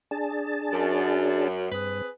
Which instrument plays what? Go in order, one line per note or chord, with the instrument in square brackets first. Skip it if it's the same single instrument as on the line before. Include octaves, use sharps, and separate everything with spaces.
[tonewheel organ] D4 G#4 A5
[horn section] F#2
[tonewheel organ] G2 [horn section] C4 G#4 B4